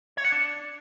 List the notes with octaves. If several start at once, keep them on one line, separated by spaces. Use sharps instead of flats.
C#5
F#5
D4